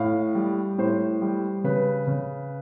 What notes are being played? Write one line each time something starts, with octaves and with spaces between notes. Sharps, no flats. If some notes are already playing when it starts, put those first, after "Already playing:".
Already playing: A2 F5
G3
A2 C5
G3
C#3 B4
C#3